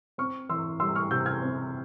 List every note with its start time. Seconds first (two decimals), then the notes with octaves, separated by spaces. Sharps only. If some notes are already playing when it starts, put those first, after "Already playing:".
0.18 C4 C#6 F6
0.49 E3 C6 E6
0.80 G3 C6 E6
0.95 C#6 F6
1.11 C3 E6 G6
1.26 F6 G#6
1.42 C4